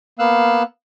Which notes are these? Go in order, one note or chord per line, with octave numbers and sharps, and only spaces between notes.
A#3 B3 F5 E6 F#6